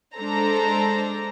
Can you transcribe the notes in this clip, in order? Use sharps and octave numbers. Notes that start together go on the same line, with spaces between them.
G#3 D4 A4 C5 A#5